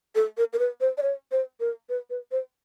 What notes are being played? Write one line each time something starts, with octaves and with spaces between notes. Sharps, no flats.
A4
A#4
A#4
B4
C5
D5
C#5
C5
A#4
B4
B4
C5